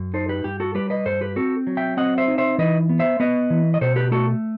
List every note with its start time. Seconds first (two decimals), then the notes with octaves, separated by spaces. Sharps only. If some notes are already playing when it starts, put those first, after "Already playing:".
Already playing: F#2
0.14 D#4 A4 C5
0.29 G4 B4
0.44 G2 G4
0.60 F#4 A4
0.75 G3 G4 B4
0.90 B4 D#5
1.05 G2 A4 C5
1.21 G4 B4
1.36 C4 F#4 A4
1.67 F#3
1.77 E5 G5
1.97 C4 D#5 F#5
2.18 C5 E5
2.28 D#4
2.38 C5 E5
2.58 E3 B4 D#5
2.89 B3
2.99 C5 E5
3.20 B3 B4 D#5
3.50 E3
3.74 D#5
3.81 B2 A4 C5
3.96 G4 B4
4.11 A3 F#4 A4